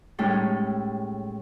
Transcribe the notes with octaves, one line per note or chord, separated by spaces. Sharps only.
A2 G3 G#3 C#4 D#4 A4